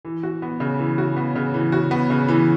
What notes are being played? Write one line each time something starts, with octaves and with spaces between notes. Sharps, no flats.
E3
F#4
B3
C#3
E3
F#4
B3
C#3
E3
F#4
B3
C#3
E3